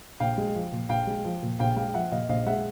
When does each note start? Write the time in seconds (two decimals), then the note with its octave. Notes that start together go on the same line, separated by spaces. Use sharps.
0.20 A#1 F5 G5
0.38 G#3
0.55 F3
0.72 A#2
0.89 A#1 F5 G5
1.07 G#3
1.24 F3
1.42 A#2
1.59 A#1 F5 G5
1.76 G#3 F5 G5
1.94 F3 E5 F#5
2.12 A#2 D#5 F5
2.29 A#1 D#5 F5
2.46 G#3 E5 F#5